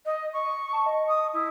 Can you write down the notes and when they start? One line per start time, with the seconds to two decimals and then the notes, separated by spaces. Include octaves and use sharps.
0.05 D#5
0.33 C#6
0.73 A5
0.86 D#5
1.08 D#6
1.33 E4